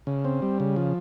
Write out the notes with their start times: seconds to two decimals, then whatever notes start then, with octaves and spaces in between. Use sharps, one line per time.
0.07 C#3
0.25 C4
0.42 G3
0.60 C#3
0.76 F3